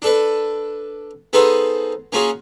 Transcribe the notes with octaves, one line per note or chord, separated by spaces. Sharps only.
D4 A4 B4
B3 D#4 G#4 A4 B4 C5
A#3 C#4 F4 F#4 G#4